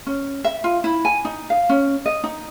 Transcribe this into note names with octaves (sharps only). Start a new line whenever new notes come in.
C#4
E5
F4
E4
G#5
D#4
F5
C#4
D#5
D#4